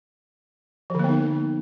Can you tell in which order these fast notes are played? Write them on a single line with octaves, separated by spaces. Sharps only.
F3 D3 A#3 B3 D#4